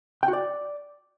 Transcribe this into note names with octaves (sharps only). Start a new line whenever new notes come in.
G5
F#4
D5